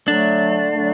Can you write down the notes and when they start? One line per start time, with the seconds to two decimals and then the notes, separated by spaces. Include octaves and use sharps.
0.08 D3 F#3 A3 D4
0.71 D3 F#3 A3